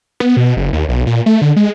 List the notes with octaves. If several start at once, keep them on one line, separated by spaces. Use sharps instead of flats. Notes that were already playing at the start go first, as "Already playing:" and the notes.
B3
B2
F#1
D#2
B1
A#2
A3
D3
G#3